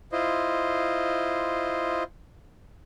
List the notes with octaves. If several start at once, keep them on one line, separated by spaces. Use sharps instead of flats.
E4 F4 C5 D#5